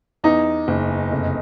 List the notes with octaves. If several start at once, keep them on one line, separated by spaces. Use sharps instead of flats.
E2 D#4
F#1
F1